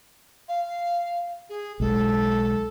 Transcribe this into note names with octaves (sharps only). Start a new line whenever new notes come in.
F5
G#4
B1 G#3 A4